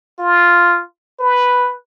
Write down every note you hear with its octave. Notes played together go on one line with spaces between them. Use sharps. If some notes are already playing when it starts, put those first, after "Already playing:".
F4
B4